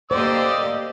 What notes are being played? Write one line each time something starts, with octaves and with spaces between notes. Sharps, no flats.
A#3 G4 C5 D5 D#5 E6